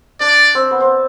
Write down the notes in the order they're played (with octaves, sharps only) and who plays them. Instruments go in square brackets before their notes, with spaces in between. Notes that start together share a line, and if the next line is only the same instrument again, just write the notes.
[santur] D4 [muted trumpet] D5
[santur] C4
B3
C4